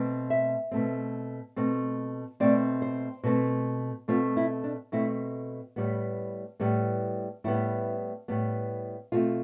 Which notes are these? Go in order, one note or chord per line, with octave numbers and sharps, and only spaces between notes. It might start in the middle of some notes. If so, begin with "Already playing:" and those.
Already playing: B2 A3 C4
E5
B2 A3 C4
B2 A3 C4
B2 A3 C4 D5
C5
B2 A3 C4
B2 A3 C4 F4
E4
D4
B2 A3 C4 E4
A2 G3 B3
A2 G3 B3
A2 G3 B3 E4
A2 G3 B3
B2 A3 C4 F4